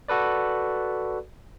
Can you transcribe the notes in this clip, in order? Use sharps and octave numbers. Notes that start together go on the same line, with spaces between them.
F#4 A4 B4 D5